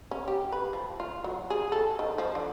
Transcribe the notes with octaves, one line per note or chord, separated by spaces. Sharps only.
C#4
G4
B4
F3
F4
F#3
G#4
A4
D#3
F3
D3